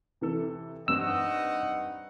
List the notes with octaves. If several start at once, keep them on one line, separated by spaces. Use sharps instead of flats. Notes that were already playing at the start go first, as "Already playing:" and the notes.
C3 E3 A4
G2 C4 D#4 D#5 F#5 E6